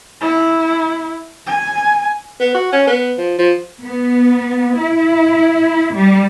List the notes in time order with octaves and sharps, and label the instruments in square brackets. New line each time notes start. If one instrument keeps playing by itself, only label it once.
[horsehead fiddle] E4
G#5
[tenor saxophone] B3
F#4
C#4
B3
F3
F3
[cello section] B3
E4
G3